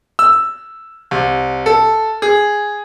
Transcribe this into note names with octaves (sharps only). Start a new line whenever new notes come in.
E6
C2
A4
G#4